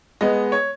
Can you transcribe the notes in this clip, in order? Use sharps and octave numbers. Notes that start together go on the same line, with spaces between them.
G#3 B3 D#5
C#5